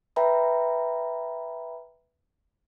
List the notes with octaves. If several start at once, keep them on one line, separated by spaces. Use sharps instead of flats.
B4 E5 G5 A#5 B5